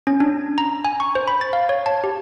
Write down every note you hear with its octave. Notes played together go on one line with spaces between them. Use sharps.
C#4
D4
A#5
G#5
C#6
C5
B5
A6
F5
C#5
A5
G4